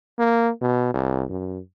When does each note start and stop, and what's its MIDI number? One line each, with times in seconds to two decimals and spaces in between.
0.19 0.50 58
0.61 0.91 47
0.94 1.25 36
1.30 1.59 42